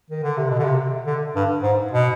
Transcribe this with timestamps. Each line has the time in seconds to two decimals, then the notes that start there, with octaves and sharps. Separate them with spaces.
0.10 D#3
0.23 D3
0.37 C3
0.50 B2
0.59 D3
0.64 C3
1.06 D3
1.35 G2
1.63 G#2
1.91 B2